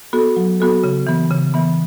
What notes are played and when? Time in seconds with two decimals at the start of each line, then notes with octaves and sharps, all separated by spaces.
0.13 B3 F#4 A4
0.36 F#3
0.60 B3 F#4 A4
0.84 C#3
1.07 E3 B3
1.30 C#3
1.54 E3 B3